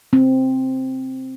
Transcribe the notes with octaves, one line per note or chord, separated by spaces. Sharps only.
C4